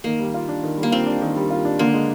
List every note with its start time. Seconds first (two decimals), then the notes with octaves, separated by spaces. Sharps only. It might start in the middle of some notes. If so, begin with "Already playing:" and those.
0.04 D#3 A#3
0.19 G3
0.34 F4
0.48 D4
0.63 D#3
0.78 G3
0.83 A#3
0.92 C4 F4
1.06 D4
1.22 D#3
1.36 G3
1.50 F4
1.65 D4
1.79 D3 A#3
1.94 G#3